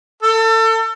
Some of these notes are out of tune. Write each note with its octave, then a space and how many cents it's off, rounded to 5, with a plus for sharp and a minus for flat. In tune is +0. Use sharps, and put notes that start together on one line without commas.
A4 +30